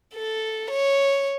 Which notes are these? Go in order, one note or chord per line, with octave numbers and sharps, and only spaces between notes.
A4
C#5